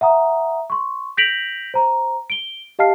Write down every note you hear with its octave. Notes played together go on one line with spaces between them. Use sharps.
E5 F#5 A#5 D#6
C6 C#6
G6 A#6 B6 D7 F7 F#7
C5 A#5
D7 G7
G4 D#5 F5 A5 F6 C7